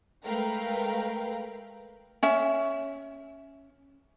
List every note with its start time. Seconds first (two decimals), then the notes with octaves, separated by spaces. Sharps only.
0.24 G#3 A3 A#4 B4 F5 G5
2.23 C#4 E5